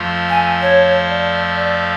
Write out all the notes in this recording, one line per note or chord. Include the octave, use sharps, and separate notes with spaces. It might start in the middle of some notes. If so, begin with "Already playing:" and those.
Already playing: F2 F3 A3 F4
G#5
C#5
D5
D5